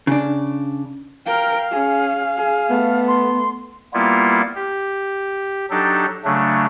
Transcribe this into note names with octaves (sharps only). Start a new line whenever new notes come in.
C#3 D4
A#4 F5 G5
C#4 G#4
G#4
A3 B3
C6
G3 A#3 B3 E4 F4
G4
F#3 D4 D#4 G4 A4
C#3 F#3 A3 D4